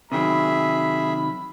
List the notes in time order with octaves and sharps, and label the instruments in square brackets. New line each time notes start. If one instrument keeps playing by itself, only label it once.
[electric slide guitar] C3 D#3 F#3 [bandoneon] G#4 E5 [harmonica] B5